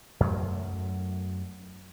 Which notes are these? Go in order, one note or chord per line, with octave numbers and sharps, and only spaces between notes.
F#2 F#3 A3